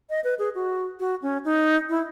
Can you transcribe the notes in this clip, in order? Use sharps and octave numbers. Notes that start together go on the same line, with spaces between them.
D#5
B4
G#4
F#4
F#4
C#4
D#4
E4